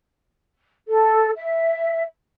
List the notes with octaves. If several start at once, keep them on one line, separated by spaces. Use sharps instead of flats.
A4
E5